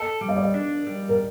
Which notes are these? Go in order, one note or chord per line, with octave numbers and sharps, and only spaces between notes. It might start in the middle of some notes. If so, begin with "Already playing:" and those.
Already playing: A4 D#5
G3
D#5
D5
D#5
D4
G3
A#4